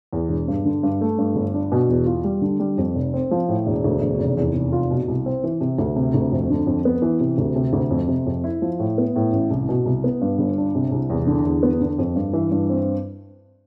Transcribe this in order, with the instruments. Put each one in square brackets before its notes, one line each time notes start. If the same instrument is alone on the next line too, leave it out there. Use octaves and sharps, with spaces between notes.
[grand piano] E2
E1
G2
D3
G2
A3
G2
G1
D4
B2
E2
F4
G3
D3
G3
F2
F1
C4
F3
A2
E1
D2
E1
F1
E2
F1
F4
B2
C2
C4
E3
C3
D2
C3
D2
F2
D3
F2
B3
E3
C3
D2
C3
D2
F2
C3
F2
E4
F3
A2
B3
A2
A1
C2
B2
C2
B3
G2
G1
D4
C3
C2
E2
D3
E2
B3
D3
F2
G2
E3
G2
C4